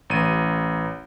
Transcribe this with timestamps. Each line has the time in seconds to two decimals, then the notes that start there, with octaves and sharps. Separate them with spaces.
0.10 A1 D#7